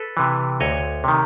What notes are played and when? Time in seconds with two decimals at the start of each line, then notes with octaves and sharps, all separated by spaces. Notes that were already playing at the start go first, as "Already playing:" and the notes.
Already playing: A4 B4
0.17 C3 E3
0.60 D2 C#5 D#5
1.04 C3 D#3